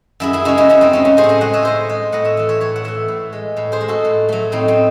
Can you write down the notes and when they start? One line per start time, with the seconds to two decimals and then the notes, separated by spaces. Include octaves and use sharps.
0.20 F#2 E4 G#4
0.33 E4 G#4
0.45 C#3 G#3 D#4 F#4
0.57 C#4 E4
0.69 F#2 C#4 E4
0.81 C4 D#4
0.93 C#3 G#3 C#4
1.05 C#4
1.17 A2 G#4 C5
1.23 C#5
1.29 C5 D#5
1.41 G#3 D#5 F#5
1.53 C#5 E5
1.63 A2 C5 D#5
1.89 G#3
2.12 A2 D#5 F#5
2.25 C#5 E5
2.37 E3 A3
2.49 C#5 E5
2.60 A2 C#5 E5
2.76 F#5
2.84 E3 A3 C#5 E5
3.08 A2
3.33 G#3
3.57 A2
3.72 G#4 C5
3.81 G#3
3.88 F#4 A4
4.05 A2
4.29 F#3 A3
4.52 A2 C4 D#4
4.68 C4